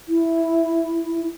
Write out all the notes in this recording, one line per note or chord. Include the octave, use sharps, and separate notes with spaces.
E4